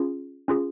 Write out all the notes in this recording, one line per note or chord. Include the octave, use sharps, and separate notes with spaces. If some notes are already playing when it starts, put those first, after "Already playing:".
Already playing: C#4 F4 G#4
C#4 F4 G#4